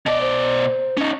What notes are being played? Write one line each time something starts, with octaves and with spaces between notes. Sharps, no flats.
B2 D5 D#5
C5
C#4 D#4